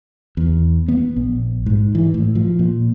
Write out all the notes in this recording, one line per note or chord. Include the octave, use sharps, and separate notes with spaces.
E2
B3
A#1
G#2
E3
A2
F3
A#2